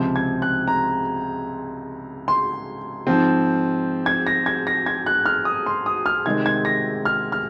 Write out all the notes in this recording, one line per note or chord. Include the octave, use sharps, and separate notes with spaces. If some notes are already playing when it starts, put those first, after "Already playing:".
Already playing: C#2 C3 F3 C4
G#6
F#6
A#5
C6
G#2 F3 C4
G#6
A#6
G#6
A#6
G#6
F#6
F6
D#6
C6
D#6
F6
C3 D#3 G#3 C4 G#6
G#6
A#6
F6
F6